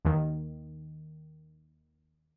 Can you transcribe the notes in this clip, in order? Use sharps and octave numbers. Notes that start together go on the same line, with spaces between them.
D#2 D#3